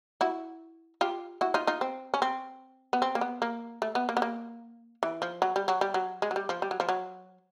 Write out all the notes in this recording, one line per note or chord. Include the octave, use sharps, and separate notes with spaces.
E4 F#4
F4 G4
E4 F#4
D#4 F4
D#4 F4
C4
C#4
C4
B3
C4
A#3
B3
A#3
A3
B3
A#3
B3
A#3
E3
F3
F#3
G3
F#3
G3
F#3
G#3
F#3
G3
F3
G3
F#3
F3
F#3